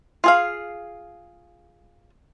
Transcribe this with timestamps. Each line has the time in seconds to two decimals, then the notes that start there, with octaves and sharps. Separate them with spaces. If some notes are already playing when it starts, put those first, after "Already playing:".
0.24 F4 G#4 F5